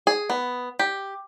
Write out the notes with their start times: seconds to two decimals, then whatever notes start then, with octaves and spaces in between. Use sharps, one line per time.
0.07 G#4
0.30 B3
0.79 G4